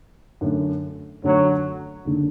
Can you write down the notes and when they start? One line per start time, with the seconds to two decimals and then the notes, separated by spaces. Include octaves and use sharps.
0.41 F#2 D3 A3
1.24 F#2 D3 F#3 A3
2.05 F#1 D3